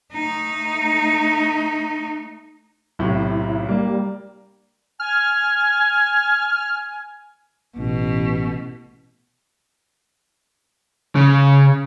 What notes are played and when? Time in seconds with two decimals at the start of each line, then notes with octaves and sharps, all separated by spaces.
0.13 A3 D#4
2.99 B1 A2 C3 E4
3.69 G3 A#3 D4
5.00 G#5 F6
7.78 A1 B2
11.15 C#3